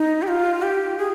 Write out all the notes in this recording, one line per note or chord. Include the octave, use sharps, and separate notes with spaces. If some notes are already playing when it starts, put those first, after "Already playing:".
Already playing: D#4
G4
F4
G4
G#4